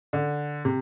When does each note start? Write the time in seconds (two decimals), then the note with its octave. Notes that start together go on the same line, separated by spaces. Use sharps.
0.13 D3
0.65 C3